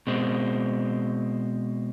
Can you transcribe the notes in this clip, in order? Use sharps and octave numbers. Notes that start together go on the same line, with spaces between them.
B2 G#3 C4